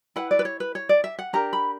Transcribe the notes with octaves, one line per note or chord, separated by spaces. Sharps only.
E4 B4 F#5
D5
B4
C#5
B4
C#5
D5
E5
F#5
D4 G4 A#4 A#5
B5